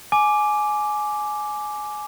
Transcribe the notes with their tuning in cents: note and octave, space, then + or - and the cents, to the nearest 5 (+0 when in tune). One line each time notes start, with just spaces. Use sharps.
G#5 +20 D6 +0